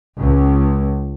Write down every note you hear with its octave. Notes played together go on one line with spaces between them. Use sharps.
C#2